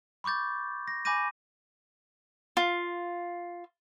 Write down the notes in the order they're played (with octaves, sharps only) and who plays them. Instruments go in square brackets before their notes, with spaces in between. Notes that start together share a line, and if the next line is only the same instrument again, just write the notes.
[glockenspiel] B5 C#6 D6 G6 A6
A#6
G#5 B5 D6 G6 A#6 D#7
[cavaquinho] F4